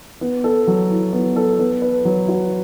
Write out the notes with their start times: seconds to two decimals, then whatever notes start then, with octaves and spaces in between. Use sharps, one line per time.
0.21 B3
0.44 A4
0.67 F#3
0.90 E4
1.13 B3
1.36 A4
1.59 B3
1.82 B4
2.05 F#3
2.28 F#4